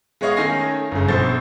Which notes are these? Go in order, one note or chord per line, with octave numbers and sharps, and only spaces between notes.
G#3 B3 C#5 D#5 F5
D#3 A3 C#4 G#5 A#6 C7
G1 C#3
A#1 B2 A4 C5 A6